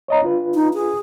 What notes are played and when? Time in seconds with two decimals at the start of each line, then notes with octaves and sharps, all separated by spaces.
0.08 C#5 D#5 A#5
0.22 D4 F4 B4
0.54 D#4
0.74 G#4